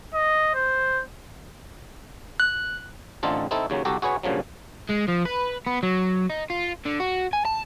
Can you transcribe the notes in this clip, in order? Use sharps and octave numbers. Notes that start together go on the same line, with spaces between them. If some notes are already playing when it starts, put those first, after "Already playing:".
D#5
C5
F#6
A1 D3 C4 D#4 F4 A4
C4 D#4 E4 A4
D#2 C#3 F#3
C2 F#4 G4 A4 A#5
F#4 G#4 B4 C#5 G#5
G2 A#2 C#3 F3 F#3
G#3
F3
B4
B3
F#3
D#4
F4
D3
F#4
G#5
A5